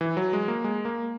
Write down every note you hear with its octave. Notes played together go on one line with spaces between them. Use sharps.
E3
F#3
G#3
A#3
G#3
A#3